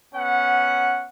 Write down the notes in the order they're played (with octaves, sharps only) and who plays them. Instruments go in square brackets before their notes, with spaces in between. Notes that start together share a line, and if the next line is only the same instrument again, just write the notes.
[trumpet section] B3 C#4 F#5